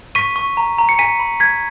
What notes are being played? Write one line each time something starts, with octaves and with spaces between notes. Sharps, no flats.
C#6 B6 D#7
C#6
A#5
A#5
C#7
G#5 B6 D#7
B5
G#5 G#6 B6